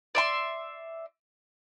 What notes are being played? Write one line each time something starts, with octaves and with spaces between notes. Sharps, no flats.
D5 E5 C6